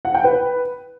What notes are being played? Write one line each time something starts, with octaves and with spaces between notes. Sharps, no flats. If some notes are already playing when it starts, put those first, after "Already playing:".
F#5
G5
B4